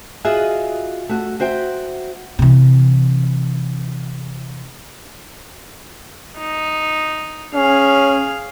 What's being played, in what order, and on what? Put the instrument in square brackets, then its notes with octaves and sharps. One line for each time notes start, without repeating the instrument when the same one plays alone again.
[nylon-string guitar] F4 F#4 G#4 D#5 E5 F#5
A3 F#4
F#4 C5 E5 G5
[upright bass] C3 E3
[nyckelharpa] D#4
[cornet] C#4 [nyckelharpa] G#4 F5